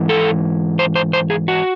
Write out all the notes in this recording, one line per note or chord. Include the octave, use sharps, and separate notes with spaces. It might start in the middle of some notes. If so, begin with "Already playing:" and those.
Already playing: G#2 E3
A4
C5
C5
C5
G#4
F#4